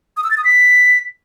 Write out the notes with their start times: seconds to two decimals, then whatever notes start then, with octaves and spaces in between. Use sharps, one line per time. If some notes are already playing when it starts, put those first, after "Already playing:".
0.17 D#6
0.24 E6
0.31 A6
0.38 D#6
0.44 B6